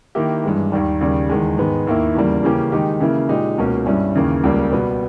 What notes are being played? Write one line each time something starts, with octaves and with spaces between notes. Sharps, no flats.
D#3 A#3 E4 G4
G2 E3 G#3
D#2 D#3 G3
D#2 C#3 G3
E2 D#3 G#3
G#2 D#3 G#3 B3
D#2 D#3 A#3 E4
E2 C#3 G3 A#3
C#3 E3 A#3 C#4 G4
D#3 G#3 D#4 G4
C#3 E3 A#3 E4
A#2 G#3 D#4 G4
C#2 B2 A#3 C#4
G2 G3 C#4 E4
D#2 C#3 E3 A#3
C#2 C#3 G3 A#3
B2 G3 B3